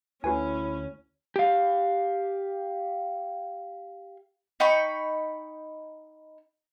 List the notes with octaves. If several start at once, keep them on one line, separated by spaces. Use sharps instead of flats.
D2 C#4 E4 F#4 B4 G#5
G4 F5
D#4 G5 B5 C#6